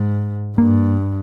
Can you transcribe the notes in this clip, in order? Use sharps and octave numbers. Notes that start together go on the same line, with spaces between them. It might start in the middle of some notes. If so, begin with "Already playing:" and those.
Already playing: G#2 G#3
G2 A#3